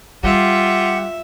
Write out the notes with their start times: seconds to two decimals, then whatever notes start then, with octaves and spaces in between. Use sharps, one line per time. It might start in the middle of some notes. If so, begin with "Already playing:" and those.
0.23 G3 F4 G4 E5 F#5